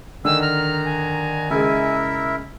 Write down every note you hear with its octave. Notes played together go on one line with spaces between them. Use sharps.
D3 D#3 D#4 G#4 D#6 E6
A#5 F6
G#5
C#3 G#3 E4 A#4 E5